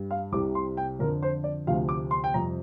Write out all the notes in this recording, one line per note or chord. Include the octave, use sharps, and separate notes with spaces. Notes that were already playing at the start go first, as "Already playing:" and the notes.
Already playing: G2 G3
F5
C2 C3 G3 D6
C6
G5
F2 D3 F3 A#4
C5
D5
D2 C3 F3 F5
D6
C6
G5
F2 C3 G3 A#5